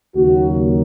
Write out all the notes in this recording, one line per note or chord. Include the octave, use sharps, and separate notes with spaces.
D#2 C#3 F#3 A#3 F#4